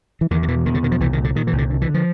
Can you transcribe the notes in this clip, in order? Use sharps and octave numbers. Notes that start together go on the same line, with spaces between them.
E3
E2 D#3
D#3
B2 E3
E2 D#3
D3
B2 D#3
F3
C2 E3
D#3
A#2
D3
A#2 D#3
E3
C2
D3
D3
E3
D3
F3